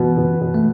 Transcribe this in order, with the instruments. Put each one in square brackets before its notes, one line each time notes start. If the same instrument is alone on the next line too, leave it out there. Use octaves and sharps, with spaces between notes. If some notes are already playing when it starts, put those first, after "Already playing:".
Already playing: [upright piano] B2 B3 [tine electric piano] E3
[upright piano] B2
B2
[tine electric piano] A3